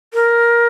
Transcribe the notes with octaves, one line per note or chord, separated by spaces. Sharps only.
A#4